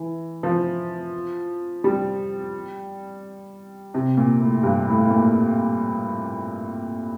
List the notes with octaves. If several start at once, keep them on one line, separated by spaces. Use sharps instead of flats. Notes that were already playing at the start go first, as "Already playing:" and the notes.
Already playing: E3
F3
G3
C3
A#2
A2
G2
A2
A2
A#2